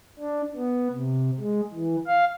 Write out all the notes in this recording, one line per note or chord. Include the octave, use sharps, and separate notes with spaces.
D4
B3
C3
G#3
E3
F5